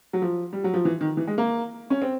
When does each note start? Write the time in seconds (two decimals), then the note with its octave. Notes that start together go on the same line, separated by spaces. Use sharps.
0.13 F#3
0.22 F3
0.53 G3
0.64 F#3
0.74 F3
0.85 E3
1.01 D#3
1.17 E3
1.27 G#3
1.38 A#3
1.90 C#4
2.02 C4